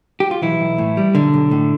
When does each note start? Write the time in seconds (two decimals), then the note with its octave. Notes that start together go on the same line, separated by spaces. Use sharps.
0.20 G4
0.31 F4
0.42 B1 E3 E4
0.60 B1
0.78 A2
0.97 G3
1.15 B1 D3 D4
1.34 B1
1.51 A2